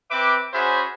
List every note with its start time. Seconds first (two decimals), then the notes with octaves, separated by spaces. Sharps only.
0.11 C4 B4 E5 D6
0.53 C#4 F#4 G#4 C5 E5 B5